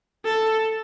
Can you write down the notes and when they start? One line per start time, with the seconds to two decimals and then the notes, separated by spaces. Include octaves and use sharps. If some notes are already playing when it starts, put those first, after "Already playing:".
0.26 A4